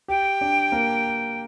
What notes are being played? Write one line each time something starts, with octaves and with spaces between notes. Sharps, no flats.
G4 G5
D4
A#3